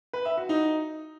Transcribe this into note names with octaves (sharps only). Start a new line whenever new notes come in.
B4
E5
F#4
D#4